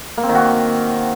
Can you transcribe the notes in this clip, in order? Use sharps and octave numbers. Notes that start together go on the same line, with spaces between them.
A#3
C4
D#3
F#4